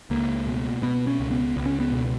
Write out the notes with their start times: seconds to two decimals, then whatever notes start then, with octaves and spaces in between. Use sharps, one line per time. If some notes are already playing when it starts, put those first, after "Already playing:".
0.10 C#2 A#3
0.47 B2
0.82 B2 B3
1.07 C#4
1.19 C#2
1.31 B3
1.56 C#2
1.66 C#4
1.80 B3
1.92 B2